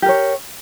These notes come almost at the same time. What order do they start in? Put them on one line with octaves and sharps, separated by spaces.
G4 A#4 C#5